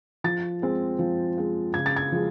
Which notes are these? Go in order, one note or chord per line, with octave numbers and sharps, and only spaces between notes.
F3 A6
G#3 C4
F3
G#3 C4
C#3 G#6
A6
G#6
F3 G#3